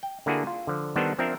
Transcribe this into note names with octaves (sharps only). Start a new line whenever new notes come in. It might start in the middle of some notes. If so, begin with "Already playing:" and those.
G5
D3 A#3 D4 E4 F#4 G#4
F4
D3 F3
D#3 G3 B3 D4 A4 C5
F3 C4 D4 A#4 E5